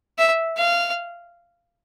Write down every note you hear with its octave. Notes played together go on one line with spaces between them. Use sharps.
E5
F5